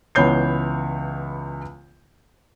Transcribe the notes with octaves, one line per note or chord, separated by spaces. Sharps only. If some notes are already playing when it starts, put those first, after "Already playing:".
C#2 E3 B3 C#5 G6 C7